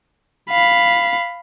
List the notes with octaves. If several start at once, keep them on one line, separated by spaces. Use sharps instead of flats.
F5 B5